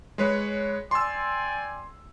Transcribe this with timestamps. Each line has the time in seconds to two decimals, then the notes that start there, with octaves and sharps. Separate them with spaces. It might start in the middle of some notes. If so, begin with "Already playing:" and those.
0.18 G#3 B4 C#5
0.91 D5 G5 G#5 C6 E6